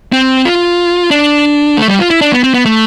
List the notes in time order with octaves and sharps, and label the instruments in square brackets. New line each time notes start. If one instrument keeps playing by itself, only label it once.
[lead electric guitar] C4
F4
D4
A3
G3
F4
E4
D4
B3
C4
B3
A3